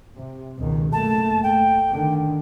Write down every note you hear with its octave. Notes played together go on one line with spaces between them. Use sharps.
C3
C#2 B2 D#3
F#1 A3 A#3 A5
A3 G5
D3 D#3